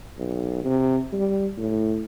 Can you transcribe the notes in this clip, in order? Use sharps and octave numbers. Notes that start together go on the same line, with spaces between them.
B1
C3
G3
A2